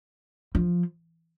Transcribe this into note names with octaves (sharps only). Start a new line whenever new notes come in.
F3